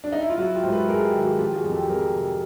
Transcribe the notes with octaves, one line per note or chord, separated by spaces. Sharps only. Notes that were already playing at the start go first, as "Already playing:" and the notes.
D4
D#4
E4
F4
F#3 E4 F#4
F4 G4
G#2 C5
A4 B4
G#2 G#4 A#4
G4 A4
D#3
F#4 G#4
F3 F4 G4
F#4 G#4
F2
G4 A4
F2 G#4 A#4
C3